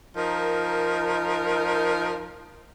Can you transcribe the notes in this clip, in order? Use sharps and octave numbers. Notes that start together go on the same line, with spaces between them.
F3 D#4 A#4